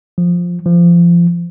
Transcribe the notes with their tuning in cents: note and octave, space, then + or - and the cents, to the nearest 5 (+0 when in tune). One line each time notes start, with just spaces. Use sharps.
F3 +5
F3 -25